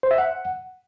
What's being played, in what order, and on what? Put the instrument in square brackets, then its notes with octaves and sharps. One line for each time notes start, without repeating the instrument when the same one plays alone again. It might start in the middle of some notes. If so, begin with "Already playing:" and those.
[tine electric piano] C5
E5
F#5